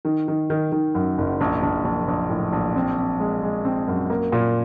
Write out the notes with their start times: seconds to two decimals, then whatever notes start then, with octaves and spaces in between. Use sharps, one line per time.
0.05 D#3
0.28 D#3
0.50 D#3
0.72 D#3
0.95 F#2
1.18 F#1
1.41 A#1
1.63 A#1
1.85 A#1
2.08 A#1
2.30 A2
2.53 A#1
2.76 C4
2.98 C4
3.20 G#3
3.43 G#3
3.65 C4
3.88 F#2
4.10 A#3
4.32 A#2